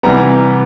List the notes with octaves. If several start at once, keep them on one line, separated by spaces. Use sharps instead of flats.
C3 E3 G3 B3 A#5